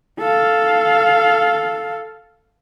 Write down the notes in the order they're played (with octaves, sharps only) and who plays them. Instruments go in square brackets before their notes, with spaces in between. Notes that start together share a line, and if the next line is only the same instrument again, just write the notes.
[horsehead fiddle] A4 F5